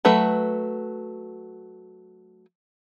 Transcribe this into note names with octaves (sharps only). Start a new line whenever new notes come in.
F#3 A3 B4